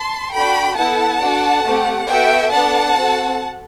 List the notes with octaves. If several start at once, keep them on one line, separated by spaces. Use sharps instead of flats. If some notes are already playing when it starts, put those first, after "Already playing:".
Already playing: A5 C6
D4 F#4 A4 G5 B5
B3 E4 A4 F#5 A5
D4 F#4 A4
A3 C4 G4
B3 F#4 A4 E5 G5
B3 D4 A4 F#5 A5
C4 F#4 A4